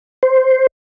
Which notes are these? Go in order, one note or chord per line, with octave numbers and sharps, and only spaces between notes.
C5